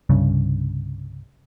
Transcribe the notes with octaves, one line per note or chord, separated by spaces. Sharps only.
C2 G2 C#3